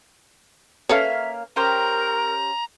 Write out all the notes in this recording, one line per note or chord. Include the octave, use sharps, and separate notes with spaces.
A#3 C#4 A4 B4 C#5 E5 F5
C#4 G4 A#4 C5 A#5